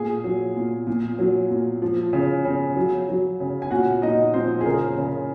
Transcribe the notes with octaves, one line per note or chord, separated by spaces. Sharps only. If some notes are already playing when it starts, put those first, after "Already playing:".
Already playing: A#2 G#4 G#5
F#3
A#2
A#2
F#3
A#2
F3
C#3
C#3
F#3
F#3
C#3
G#5
A#2 F#4 F#5
A#2 D#4 D#5
F3 C4 C5
G#4
C#3 A#4
C#3